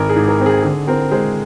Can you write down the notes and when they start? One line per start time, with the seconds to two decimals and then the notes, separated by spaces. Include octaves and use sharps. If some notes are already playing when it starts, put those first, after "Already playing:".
Already playing: G#1 A#4
0.09 G#4
0.15 G#2
0.28 A#4
0.40 C4
0.46 G#4
0.63 D3 G#4
0.87 C4 A#4
1.12 G#3 G#4 C5